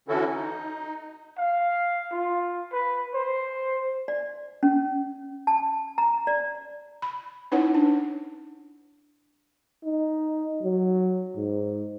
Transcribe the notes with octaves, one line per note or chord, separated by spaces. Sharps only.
D3 E3 C#4 E4 F#4 A4
D#4
F5
F4
B4
C5
D5
C#4
A5
A#5
D5
B5
C#4 D#4 E4 B4 C#5 F#5
D4
D#4
F#3
G#2